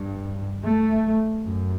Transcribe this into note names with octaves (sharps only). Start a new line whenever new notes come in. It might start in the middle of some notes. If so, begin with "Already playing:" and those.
Already playing: G2
A3
F#2